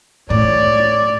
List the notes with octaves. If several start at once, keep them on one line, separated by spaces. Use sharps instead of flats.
A2 C#5 D5